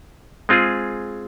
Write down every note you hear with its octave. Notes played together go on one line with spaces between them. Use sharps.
G#3 C4 F4 G#4